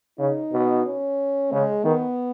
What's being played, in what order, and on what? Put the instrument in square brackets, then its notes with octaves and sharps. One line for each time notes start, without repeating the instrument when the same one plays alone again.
[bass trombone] C#3 [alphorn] D#4
[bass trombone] B2
[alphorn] C#4
[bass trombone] C#3 [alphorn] G#3
[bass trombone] D#3 [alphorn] B3